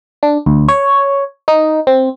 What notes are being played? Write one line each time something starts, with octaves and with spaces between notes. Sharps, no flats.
D4
D2
C#5
D#4
C4